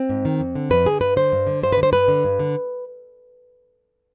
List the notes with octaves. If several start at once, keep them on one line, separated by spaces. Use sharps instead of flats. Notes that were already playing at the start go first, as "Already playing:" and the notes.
Already playing: C4
G#2
D#3
F2
D3
F2 B4
D3 G#4
G2 B4
D3 C5
G2
D3
G2 C5
D3 B4
C5
G2 B4
D3
G2
D3